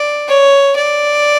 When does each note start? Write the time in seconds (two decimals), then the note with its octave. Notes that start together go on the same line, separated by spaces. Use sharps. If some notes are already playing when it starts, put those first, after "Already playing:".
Already playing: D5
0.28 C#5
0.76 D5